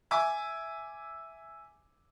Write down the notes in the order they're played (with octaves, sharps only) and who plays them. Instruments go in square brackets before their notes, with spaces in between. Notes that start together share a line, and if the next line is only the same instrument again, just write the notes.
[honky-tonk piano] E5 G#5 D6